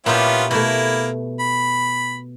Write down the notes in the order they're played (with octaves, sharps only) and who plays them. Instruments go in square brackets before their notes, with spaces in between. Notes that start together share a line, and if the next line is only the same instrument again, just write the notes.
[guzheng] A#2 E4 G4 [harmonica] B3 C#4 F4
[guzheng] B2 A3 [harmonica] A#3 E4
[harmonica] B5